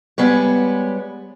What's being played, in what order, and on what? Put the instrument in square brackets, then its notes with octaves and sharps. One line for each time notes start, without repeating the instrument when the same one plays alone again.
[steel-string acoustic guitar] G3 G#3 B3 C#5